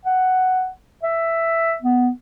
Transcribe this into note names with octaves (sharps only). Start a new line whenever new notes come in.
F#5
E5
B3